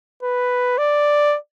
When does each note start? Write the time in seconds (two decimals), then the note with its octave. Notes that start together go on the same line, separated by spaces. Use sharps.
0.23 B4
0.78 D5